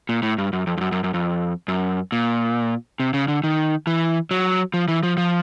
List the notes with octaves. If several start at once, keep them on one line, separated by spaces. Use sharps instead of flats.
A#2
A2
G2
F#2
F2
F2
F#2
F#2
F#2
F2
F#2
A#2
C3
C#3
D3
D#3
E3
F#3
F3
E3
F3
F3